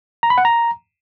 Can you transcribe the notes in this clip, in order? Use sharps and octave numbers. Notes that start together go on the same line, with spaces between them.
A#5
B5
F#5
A#5